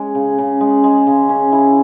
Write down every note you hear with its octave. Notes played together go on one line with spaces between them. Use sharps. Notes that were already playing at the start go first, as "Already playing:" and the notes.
Already playing: G#3 C#4
C#3
C#3
G#3
G#3
C#3
C#4
E4